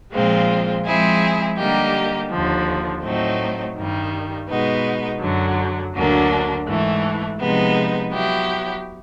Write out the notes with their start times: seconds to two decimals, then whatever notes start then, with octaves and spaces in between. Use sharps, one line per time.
0.12 A#2 F3 G#3 C4 F4
0.84 F3 G#3 C4 E4 G#4
1.57 D3 G3 A#3 D#4 G4
2.30 D#2 D3 F3
3.01 A2 F#3 A3 C4 D#4
3.75 G2 D#3 G3
4.47 B2 G#3 B3 D#4
5.20 F#2 D3 F#3
5.92 D2 D3 F#3 A#3 D4
6.65 G#2 E3 A3
7.38 C3 F3 G#3 B3 D#4
8.10 F#3 B3 E4 G4